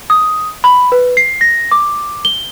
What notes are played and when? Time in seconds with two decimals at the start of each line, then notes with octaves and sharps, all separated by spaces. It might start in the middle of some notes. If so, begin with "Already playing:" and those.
0.10 D#6
0.64 B5
0.92 B4
1.17 C7
1.41 A#6
1.72 D6
2.25 G7